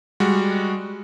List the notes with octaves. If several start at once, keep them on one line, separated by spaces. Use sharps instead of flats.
G3 G#3 F#4